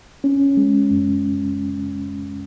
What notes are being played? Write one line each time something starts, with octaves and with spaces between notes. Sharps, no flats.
C#4
G#3
F#2